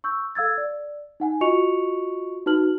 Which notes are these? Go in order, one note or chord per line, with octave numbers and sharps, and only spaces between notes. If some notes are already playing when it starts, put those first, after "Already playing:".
C#6 E6 G6
A4 F5 E6 G#6 A6
D5
D#4 F#5 G#5
F4 F#4 D#5 C#6 C#7 F7
D#4 F#4 B4 A5 F6 F#7